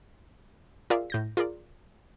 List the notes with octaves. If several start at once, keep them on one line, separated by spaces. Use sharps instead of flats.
F4 G#4 A#4 D5 E5 F5
A2 G6 A#6
F4 G#4 A#4 D5